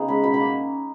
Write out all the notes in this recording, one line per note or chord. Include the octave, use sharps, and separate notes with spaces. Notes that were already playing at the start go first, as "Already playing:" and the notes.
Already playing: C#3 B3 D#4
G#3 C#4 B5
B2 B5
B5
A#3 C#4